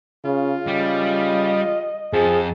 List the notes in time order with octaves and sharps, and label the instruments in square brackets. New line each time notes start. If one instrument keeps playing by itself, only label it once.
[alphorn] C#3 [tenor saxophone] F4
[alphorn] C#3 [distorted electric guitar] G3 [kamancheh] D#5
[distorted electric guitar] F2 A4 [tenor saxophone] F3 [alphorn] G#4